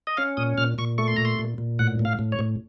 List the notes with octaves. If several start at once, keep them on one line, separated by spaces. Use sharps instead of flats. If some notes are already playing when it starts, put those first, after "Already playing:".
D#5
C#4 F5
A#2 D#6
A#2 F6
A#2 C#6
A3 C#6
C6
A#2 A#5
C6
A#2
A#2
A2 F#5
A2
F5
A2
C#5
A2